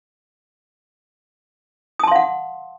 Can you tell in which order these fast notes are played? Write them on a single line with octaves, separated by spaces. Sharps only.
D#6 A5 C6 F5 F#5